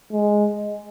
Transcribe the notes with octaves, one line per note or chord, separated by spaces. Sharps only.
G#3